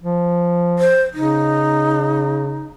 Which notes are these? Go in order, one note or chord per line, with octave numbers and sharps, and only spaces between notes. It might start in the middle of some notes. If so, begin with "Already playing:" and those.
F3
C5
C#3 D#4